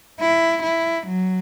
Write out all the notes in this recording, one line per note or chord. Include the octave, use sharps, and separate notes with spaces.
E4
E4
F#3